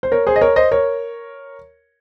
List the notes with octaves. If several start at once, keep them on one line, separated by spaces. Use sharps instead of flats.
C5
A#4 C#5
G#4 C5
D#5
A#4 C#5
C5 D#5
A#4 C#5